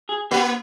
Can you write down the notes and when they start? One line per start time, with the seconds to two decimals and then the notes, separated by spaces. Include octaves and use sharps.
0.09 G#4
0.31 A#3 G4